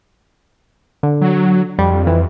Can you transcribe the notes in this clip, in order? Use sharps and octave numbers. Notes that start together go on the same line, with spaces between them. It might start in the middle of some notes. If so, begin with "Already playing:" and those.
D3
F#3
F2 G3
E3